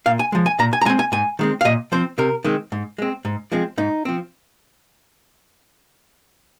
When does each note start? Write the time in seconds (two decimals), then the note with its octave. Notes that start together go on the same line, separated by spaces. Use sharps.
0.06 A#2 F5
0.19 G#5
0.32 F3 G#3
0.46 G#5
0.59 A#2 A#5
0.73 G#5
0.81 A#5
0.85 G#3 G#5
0.89 C4
0.99 G#5
1.12 G#2 G#5
1.39 D#3 G#3 C4
1.61 F5
1.65 A#2 D#5
1.92 F3 C4 C5
2.18 C3 A#4
2.44 D#3 G#3 C4
2.72 G#2
2.98 G#3 C4
3.25 G#2
3.52 F3 G#3 C4
3.78 G#2 D#4
4.05 F3 C4